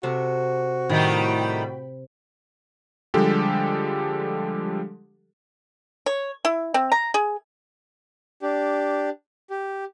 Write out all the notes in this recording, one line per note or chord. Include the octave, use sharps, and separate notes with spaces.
C3 F#4 A4
A2 D#3 G3 G5 B5
D3 F3 G3 G#3 G4 A4
C#5
E4
C4
A#5
G#4
D4 G4
G4